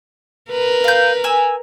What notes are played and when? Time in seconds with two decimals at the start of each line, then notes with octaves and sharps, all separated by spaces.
0.51 A#4 B4
0.84 F5 G6
1.24 G#5 E6